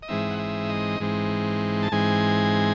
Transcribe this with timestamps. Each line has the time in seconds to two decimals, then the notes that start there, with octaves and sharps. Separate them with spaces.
0.02 D#5
0.08 G#2 E3 G#3 C4 D#4 E5
0.31 F#5
0.39 E5
0.70 D#5
1.00 G#2 E3 G#3 C4 D#4
1.83 A5
1.92 G#2 E3 G#3 C4 D#4 G#5